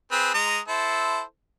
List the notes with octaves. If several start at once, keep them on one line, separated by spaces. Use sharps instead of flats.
C4 G#4 B4
G#3 A#5 D#6
E4 A4 C5